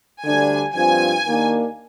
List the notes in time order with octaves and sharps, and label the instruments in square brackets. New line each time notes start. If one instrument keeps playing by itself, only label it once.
[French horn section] D2 D3 G3 D4 [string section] G#5
[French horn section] G2 F3 C4 F4 [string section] G#5
[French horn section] D#2 D#3 A#3 D4